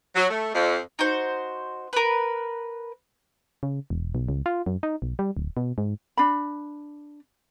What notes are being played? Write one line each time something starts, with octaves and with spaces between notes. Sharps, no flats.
F#3
A3
F2
D#4 F#4 C5
A#4 B4
C#3
E1
B1
C#2
F4
F#2
D#4
B1
G3
D1
B2
G#2
D4 B5